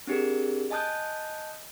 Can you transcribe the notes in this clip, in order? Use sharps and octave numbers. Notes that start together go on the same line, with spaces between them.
C4 D4 G4 G#4 A#4
D#5 G#5 A5 D#6 F#6 G6